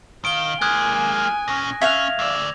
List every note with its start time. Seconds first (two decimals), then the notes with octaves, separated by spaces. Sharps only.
0.25 D#3 F5 D7 G7
0.61 G#3 A#3 G#5 D#6 F#6 G#6
1.48 A#2 C#4 A#6
1.82 C#4 E5 F5 F#6 G#6 F7
2.19 D2 D5 E6